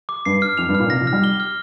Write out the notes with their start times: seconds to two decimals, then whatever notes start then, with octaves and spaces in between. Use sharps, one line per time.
0.09 D6
0.25 G2 C7
0.42 F6
0.57 F2 F7
0.69 G2
0.75 F6
0.80 A#2
0.90 C3 A#6
1.01 F3
1.07 F6
1.13 G3
1.24 G7
1.40 F6